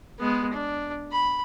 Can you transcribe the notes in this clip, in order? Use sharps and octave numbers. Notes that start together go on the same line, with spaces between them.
G#3 B3
D4
B5